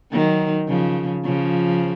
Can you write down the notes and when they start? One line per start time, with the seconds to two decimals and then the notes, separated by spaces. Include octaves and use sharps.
0.12 D#3 F#3
0.68 C#3 F3
1.24 C#3 F3